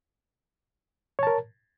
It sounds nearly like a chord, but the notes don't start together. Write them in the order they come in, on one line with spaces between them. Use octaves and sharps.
C#5 A5 A#4